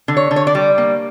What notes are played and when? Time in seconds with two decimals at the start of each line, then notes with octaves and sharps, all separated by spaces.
0.08 D3
0.17 C#5
0.31 D3
0.36 C#5
0.47 D5
0.55 G3
0.78 A#3